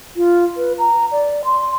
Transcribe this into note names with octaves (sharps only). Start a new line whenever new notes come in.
F4
B4
A#5
D5
C6